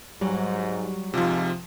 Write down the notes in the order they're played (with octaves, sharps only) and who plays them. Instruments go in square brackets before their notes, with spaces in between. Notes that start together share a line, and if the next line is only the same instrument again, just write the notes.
[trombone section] G#2 [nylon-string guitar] F#3 [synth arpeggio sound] G3
[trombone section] F2 G#2 F4 [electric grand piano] C3 F3